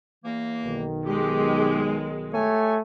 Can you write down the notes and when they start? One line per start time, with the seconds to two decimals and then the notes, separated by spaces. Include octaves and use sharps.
0.25 E2 E3 A#3
0.64 B1 D#3
1.06 G#3 G4
2.34 A3 G4 C#5 G#5